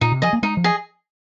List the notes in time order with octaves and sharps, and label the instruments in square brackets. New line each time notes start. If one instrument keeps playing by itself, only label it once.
[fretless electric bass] A#2 [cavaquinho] D#4
[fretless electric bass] C3
[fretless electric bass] F3 [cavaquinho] G#4 D#5
[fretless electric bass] A#3
[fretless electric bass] G#3 [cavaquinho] D#4
[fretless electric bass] F3
[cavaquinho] G#4 D#5